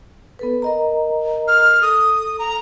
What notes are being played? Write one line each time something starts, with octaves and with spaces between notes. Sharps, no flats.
B3 A4 B4
A#4 D#5 A#5
F6
A4 D#6
A#5